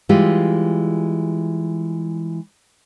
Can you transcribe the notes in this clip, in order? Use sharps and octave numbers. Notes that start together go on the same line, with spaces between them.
E3 G3 G#3 F4 G4